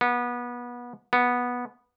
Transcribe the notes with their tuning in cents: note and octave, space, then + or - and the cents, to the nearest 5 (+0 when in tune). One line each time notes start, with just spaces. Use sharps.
B3 -25
B3 -10